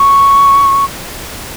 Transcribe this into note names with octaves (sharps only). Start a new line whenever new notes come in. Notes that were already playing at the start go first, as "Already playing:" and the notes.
Already playing: C#6